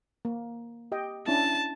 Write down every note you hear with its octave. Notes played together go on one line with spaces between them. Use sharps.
A#3
G4 D#5 G5
C#4 D4 E4 A5